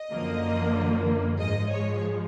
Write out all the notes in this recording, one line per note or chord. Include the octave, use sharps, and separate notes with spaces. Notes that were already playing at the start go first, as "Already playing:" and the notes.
Already playing: D#5
F#2 D3 F3 A#3
G#2 F3 G#3 D#5
C#5